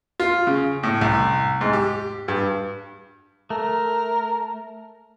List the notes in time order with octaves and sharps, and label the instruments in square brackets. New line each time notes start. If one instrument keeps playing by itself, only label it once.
[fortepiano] F4
C#3
A2
C2
G#2
G4
G2
[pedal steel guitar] A3 [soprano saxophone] A#4